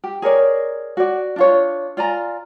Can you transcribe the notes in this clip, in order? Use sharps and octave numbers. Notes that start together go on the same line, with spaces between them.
G4
G#4 A#4 C#5 D5
F#4 D5
D4 F4 C#5
F4 D5 G#5 A#5